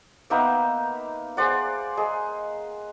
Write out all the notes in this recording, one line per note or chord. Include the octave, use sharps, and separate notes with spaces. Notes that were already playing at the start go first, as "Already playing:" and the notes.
A#3 B3 D#4 E5
G#4 C5 D5 F#5
G#4 D#5